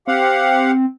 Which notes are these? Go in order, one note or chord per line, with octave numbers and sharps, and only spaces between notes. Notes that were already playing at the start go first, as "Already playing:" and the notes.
C4 G4 F5 F#5